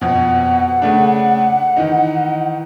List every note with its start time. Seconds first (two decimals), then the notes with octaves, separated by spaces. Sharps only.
0.01 F2 B2 F#5
0.82 C#3 A3 D4
1.77 D#3 E3 D#4